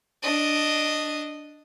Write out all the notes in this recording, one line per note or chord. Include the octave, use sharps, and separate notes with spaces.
D4 D#5